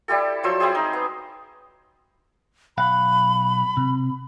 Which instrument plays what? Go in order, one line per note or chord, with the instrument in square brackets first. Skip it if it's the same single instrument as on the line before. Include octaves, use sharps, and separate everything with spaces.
[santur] G3 E4 G4 A4
F3 F#3 C5 E6
C4 E4 G4 G#4
D#4
B3
[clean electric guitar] B1 F5 F#5 [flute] B5
[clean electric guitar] C3